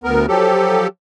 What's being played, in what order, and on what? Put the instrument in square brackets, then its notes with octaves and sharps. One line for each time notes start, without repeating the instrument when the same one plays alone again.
[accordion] D2 B3 A#4
F3 F#3 G4 A4